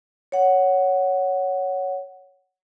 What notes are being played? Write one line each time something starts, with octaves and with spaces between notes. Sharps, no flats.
C#5 F#5